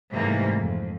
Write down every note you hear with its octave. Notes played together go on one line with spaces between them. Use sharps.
G#2 C3 E3 G3 A3 A#3
F2